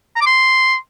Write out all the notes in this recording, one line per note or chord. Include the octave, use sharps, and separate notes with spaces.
A#5
D6
C6